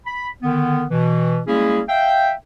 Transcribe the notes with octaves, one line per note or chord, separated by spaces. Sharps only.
B5
D3 D#3 B3
B2 E3
G3 G#3 A#3 C#4 E4 G#4
E5 F5 G5